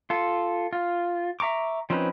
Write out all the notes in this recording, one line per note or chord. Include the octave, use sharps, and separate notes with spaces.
F4 A4
F4
E5 A#5 C#6 D6
F3 C4 C#4 D#4 B4